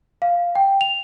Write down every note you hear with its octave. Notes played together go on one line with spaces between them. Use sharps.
F5
G5
F7